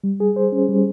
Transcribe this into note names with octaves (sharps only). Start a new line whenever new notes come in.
G3
G#4
C5
C#4
G3